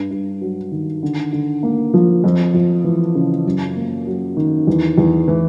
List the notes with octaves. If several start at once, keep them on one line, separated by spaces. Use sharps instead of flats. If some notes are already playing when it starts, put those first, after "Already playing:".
Already playing: G2
G2
F#3
D#3
D3
D3
A#3
F3
F2
F2
E3
C#3
F#2
A#3
F#3
D#3
E2
E2
E3